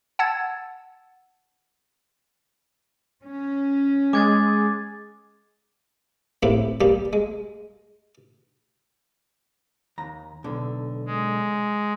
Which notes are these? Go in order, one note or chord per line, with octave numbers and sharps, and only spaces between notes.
F#5 A5 E6 G#6 A6
C#4
G#3 D6 G#6 A6
A2 A#3 C4 E4 G4
G3 A#3 G4
G#3
D#2 A#5
B1 D3
G#3